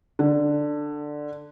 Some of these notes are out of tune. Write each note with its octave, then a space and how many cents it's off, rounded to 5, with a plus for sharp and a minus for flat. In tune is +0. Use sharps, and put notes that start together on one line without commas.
D3 +10